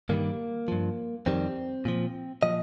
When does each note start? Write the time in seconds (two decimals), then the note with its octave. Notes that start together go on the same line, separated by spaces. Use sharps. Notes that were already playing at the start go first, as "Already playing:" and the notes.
0.09 G2 D#3 G3 A#3
0.68 G2 F3
1.26 F2 D#3 G3 C4
1.85 A#2 F3
2.43 A#2 F3 D#5